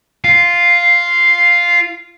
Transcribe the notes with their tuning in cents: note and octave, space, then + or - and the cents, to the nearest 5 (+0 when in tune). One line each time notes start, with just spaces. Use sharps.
F4 +0 F5 +0